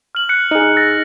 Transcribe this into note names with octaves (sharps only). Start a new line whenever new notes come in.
F6 F#7
F#6 C#7
D#4 G#4
E6 A6 A#6